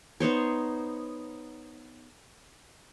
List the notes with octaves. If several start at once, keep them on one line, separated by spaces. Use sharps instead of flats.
B3 D#4 C5 C#5